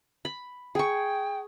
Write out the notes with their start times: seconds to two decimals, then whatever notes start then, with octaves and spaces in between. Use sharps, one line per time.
0.25 B5
0.75 G#4 G5 C#6